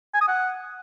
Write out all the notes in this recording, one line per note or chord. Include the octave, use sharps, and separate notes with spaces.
G#5
D#6
F#5